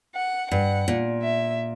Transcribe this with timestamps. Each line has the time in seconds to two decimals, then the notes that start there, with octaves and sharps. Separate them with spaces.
0.16 F#5
0.51 G2 F#5
0.88 A#2
1.23 E5